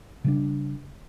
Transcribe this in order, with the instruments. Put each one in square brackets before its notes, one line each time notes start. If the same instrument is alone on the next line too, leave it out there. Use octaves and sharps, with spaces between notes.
[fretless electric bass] C#3 G3 D4